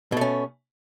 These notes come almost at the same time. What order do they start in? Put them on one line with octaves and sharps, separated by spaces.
B2 A3 C#4